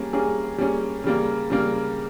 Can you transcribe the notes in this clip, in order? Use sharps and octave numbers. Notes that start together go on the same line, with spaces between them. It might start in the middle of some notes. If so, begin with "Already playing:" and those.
Already playing: G3 A#3 C#4 G#4
G3 A#3 C#4 G#4
G3 A#3 C#4 G#4
C#3 G3 A#3
C#3 G3 A#3